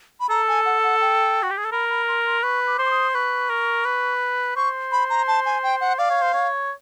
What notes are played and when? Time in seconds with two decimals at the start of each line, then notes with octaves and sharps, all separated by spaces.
0.20 B5
0.30 A4 A#5
0.48 G#5
0.66 F#5
0.83 F#5
1.01 G5
1.43 F#4
1.50 G4
1.58 G#4
1.65 A4
1.72 A#4 B5
1.90 B5
2.08 C6
2.26 C6
2.43 B4 C#6
2.67 D6
2.79 C5
2.86 D6
2.91 D#6
3.14 B4 C#6
3.50 A#4
3.85 B4
4.56 C5 C#6
4.92 B5
5.10 A#5
5.28 A5
5.46 G#5
5.63 G5
5.81 F#5
5.98 D5 F5
6.10 C#5
6.22 C5
6.33 C#5